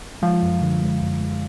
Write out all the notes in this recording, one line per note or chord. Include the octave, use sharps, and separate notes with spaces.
F3 G#3
F#2
D3
G#3
F#2
G#3